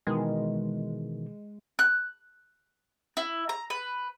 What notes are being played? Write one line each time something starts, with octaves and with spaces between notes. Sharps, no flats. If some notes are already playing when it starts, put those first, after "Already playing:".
B2 D#3 E3 G#3
F#6
E4
A#5
B4